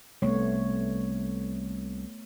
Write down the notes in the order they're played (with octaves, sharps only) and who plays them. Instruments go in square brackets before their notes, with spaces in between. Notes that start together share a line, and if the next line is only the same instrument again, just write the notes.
[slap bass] C2 [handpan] A3 B3 C#5